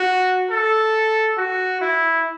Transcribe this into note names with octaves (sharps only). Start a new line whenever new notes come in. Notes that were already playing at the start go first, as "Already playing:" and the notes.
Already playing: F#4
A4
F#4
E4